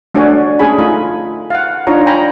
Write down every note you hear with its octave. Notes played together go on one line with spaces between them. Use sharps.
A3 D4 F#4 C#5 D5 G#5
A3 C#4 G#4 G#5 A5 B5
A3 D#4 F4 G#5 B5
F5 F#5
D4 D#4 F4 C#5 A#5
G5 G#5 A#5 B5